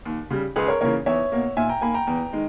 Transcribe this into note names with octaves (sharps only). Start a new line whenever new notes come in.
D#2
C#3 G3
C#2 G#4 B4
A#4 C#5
C#3 E3 A#3 A#4 C#5
E2 C#5 E5
B2 A#3
A#2 E5 G#5
G5 A#5
A#3 G#5 B5
G5 A#5
E2
D#3 G#3